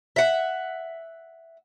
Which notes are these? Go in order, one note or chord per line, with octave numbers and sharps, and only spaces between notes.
E5 F#5